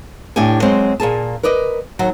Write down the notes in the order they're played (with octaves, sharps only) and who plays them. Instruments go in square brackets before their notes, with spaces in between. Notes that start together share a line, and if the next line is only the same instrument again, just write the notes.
[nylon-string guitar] A2 D4 E4 G4 G#5
F#3 G#3 C4 C5
A#2 A#3 G#4 A5
A#4 B4 D5 D#5
D#2 F#3